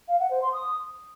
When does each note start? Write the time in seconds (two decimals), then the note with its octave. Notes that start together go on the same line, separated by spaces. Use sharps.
0.08 F5
0.20 F#5
0.31 C5
0.42 C6
0.53 D#6